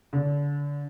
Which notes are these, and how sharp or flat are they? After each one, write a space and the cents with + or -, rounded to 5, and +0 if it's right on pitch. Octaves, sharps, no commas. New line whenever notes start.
D3 -30